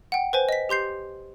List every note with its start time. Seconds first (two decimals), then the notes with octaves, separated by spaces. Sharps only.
0.12 F#5 G5
0.33 B4 C5 G#5
0.49 D#5 B6
0.69 G4 C6 G6 C7